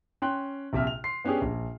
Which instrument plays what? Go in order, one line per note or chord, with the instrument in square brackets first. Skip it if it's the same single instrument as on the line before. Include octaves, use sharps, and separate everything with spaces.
[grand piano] C#4 G5 C6 F#6
A#1 C3 E5 F6
F7
C6 C7
B3 C#4 D4 G4 G#4
A#1